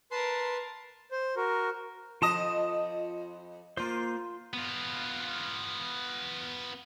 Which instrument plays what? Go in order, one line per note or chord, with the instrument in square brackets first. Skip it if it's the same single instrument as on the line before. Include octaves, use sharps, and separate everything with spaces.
[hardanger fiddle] A#4 A5 [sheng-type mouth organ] B4 C6
[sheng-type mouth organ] C5
F#4 A#4
[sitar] F2 D#5 [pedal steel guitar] F4 A5 D#6
[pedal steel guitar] A#3 C5 [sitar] F4
[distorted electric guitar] B3 F4